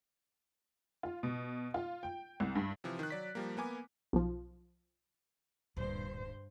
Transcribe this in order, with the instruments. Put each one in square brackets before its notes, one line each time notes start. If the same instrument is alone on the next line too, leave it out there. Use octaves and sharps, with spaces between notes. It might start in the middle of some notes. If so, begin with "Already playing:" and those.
[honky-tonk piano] F4
B2
F4
G5
C2
G2
[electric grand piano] C3 E3 F3
D#3 F#6
F#3 D5 B6
F3 G3 A#3
A#3 B3 G#5 D6
[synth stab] B1 F3
[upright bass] D1 A#2 [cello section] G2 C5